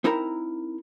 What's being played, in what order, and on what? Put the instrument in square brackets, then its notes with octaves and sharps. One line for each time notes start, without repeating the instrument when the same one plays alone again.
[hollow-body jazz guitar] C4 D#4 E4 A#4 A#5